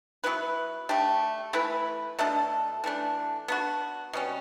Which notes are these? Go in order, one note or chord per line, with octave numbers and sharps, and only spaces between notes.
F#3 B3 E4 B4
A3 D4 G4
E3 A3 E4 B4
B2 A3 D4 A4
E3 A3 D4
B3 D4 F#4
B2 G3 C#4